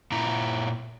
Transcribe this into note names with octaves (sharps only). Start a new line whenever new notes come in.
A#2 E4 A#5